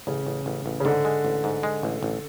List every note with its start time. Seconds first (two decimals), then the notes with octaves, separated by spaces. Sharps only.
0.07 A1 C#3
0.27 A1
0.46 A1
0.66 A1
0.80 C#3
0.85 G#2 D3
1.05 G#3
1.25 A1
1.44 G#2
1.63 G#3
1.83 A1
2.03 A1